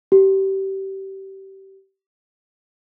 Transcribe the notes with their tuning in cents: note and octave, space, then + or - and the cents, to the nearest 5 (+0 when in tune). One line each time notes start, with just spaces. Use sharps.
G4 -25